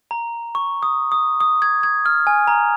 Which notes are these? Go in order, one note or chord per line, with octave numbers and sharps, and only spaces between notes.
A#5
C#6
D#6
D#6
D#6
G#6
G#6
F6
G#5
A#5